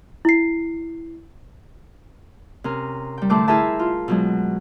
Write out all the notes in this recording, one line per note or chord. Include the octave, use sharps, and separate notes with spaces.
E4 C7
C3 C#4 A#4
G3 G5
A2 D3 A3 C5 D6
E4 G#4 A#4 C5 E5 A5
F4
B2 F#3 G#3